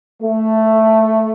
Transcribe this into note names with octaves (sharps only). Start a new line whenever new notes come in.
A3